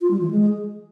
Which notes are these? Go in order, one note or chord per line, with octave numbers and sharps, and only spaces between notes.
F4
G3
E3
G#3